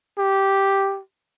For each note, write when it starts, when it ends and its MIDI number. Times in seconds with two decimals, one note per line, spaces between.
0.18 1.00 67